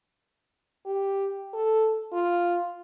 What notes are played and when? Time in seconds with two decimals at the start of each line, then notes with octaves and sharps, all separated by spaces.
0.86 G4
1.53 A4
2.12 F4